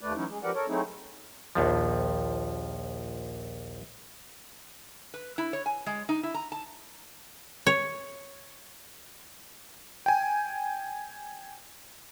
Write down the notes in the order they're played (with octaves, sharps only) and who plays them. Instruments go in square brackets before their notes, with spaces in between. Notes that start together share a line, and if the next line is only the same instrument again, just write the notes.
[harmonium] D#2 A3 B4 D5
E3 F#3 C#4 D#4 E4
G#3
F3 G4 A#4 B4 D5 F#5
A4 A#4 C#5
F#3 A3 C4 D#4 E4 G#4
[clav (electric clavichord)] A#1 D#2 F3
[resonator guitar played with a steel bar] B4
E4
C#5
G#5
G#3
D#4
E4
A#5
A5
[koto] C#5
[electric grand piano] G5 G#5